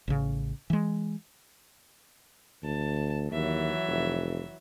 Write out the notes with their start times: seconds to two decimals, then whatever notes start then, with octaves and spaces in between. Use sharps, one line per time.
0.08 A1 C#3
0.70 E3 G#3
2.63 D2 A5
3.32 D#2 E3 F#3 E5
3.88 F1